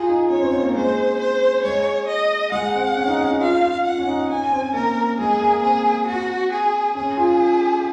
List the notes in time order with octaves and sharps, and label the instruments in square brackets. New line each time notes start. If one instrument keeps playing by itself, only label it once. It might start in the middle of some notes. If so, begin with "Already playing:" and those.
Already playing: [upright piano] F4 [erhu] G#4
[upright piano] D#4
[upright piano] C#4 [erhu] C#5
[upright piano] C4
C4
A#3
[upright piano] G#3 [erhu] C5
[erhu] C5
[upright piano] G#3 [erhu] C#5
[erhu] D#5
[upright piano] G#3 [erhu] F#5
[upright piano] C4
C#4
D#4
C#4
D#4
[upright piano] F4 [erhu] F5
[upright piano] F4
[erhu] F#5
[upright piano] C#4
D#4
[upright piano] C#4 [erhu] G#5
[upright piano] C4
[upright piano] A#3 [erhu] A#4
[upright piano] G#3 [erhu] G#4
[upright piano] A#3
[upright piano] C4 [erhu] G#4
[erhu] F#4
G#4
[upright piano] C#4 [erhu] G#4
[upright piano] F4